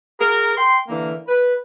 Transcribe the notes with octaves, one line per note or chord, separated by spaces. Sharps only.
F#4 G#4 A#4
G5 C6
D3 E3 A#3
B4